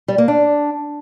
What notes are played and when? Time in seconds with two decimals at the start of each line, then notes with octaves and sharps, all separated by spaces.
0.08 G3
0.18 A#3
0.28 D4